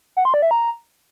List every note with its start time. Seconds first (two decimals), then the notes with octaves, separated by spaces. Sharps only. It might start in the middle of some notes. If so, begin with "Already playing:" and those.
0.17 F#5
0.25 C6
0.34 D5
0.42 E5
0.51 A#5